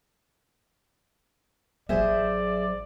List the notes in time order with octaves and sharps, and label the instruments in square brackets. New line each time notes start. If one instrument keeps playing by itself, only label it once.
[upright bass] A1 F#3 [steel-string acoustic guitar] G#4 C5 E5 [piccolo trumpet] D5